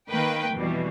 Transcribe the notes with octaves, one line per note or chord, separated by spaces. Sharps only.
D#3 A#3 B4 G5
F2 B2 E3 G3